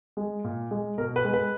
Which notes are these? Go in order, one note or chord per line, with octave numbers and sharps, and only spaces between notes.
G#3
A#2
G#3
B2 A#4
B4
G#3
B4